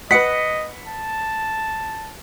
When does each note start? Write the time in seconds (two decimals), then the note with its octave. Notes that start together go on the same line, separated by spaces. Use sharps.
0.11 B4 D#5 F#5 B6 C#7
0.87 A5